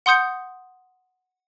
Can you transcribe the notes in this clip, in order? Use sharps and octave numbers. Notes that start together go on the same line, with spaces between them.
F#5 C6 D#6 G6 C#7